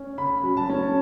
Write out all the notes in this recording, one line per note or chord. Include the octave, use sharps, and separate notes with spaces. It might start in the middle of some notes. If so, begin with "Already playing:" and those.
Already playing: C#4
C#3 B5
F#3
A5
C#4